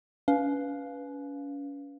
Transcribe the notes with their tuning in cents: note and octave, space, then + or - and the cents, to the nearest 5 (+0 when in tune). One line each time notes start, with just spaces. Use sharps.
C#4 +35 B4 +0 F5 +0